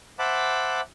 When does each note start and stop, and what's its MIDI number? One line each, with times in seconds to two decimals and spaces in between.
0.19 0.81 72
0.19 0.81 76
0.19 0.81 78
0.19 0.81 81
0.19 0.81 83
0.19 0.81 86